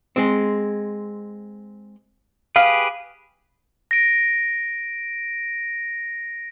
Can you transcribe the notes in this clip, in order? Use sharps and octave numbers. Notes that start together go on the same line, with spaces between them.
G#3 C4
G4 G#4 B4 F5 F6
A#6 D7